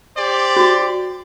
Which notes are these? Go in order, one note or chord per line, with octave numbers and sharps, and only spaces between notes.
G4 C5 D5
F#4